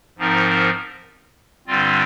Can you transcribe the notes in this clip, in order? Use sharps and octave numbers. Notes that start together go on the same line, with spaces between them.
G#2 F3 C4 D#4 A#4
G2 D3 G3 C4 F4